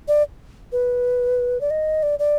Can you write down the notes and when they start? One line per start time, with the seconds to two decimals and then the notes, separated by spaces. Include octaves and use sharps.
0.08 D5
0.72 B4
1.61 D5
1.70 D#5
2.03 D5
2.19 D5